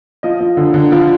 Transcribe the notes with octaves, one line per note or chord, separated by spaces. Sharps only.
F3 D#5
F3
D3
D3
F3